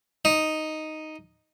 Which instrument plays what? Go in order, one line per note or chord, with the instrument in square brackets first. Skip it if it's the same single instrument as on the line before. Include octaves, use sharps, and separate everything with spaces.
[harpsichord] D#4